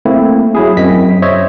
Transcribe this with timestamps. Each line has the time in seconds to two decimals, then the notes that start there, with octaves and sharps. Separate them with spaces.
0.05 A3 A#3 C4 E4
0.55 F#3 E4 G#4
0.77 F#2 C4 D#5 B6
1.22 C5 C#5 D#5 E5